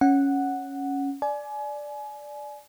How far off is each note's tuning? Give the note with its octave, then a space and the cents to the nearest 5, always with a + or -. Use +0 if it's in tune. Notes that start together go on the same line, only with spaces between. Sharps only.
C#4 +0 F#5 +0
D5 +0 G#5 +30